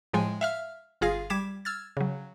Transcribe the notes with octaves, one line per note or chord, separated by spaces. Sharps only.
A2 F3 G#3 G5 G#5
E5 F5 F6
G1 F4 G#4 F5 A#6
G3 D6 G#6 B6 E7
E6 F6 G#6 A6
C#3 F#3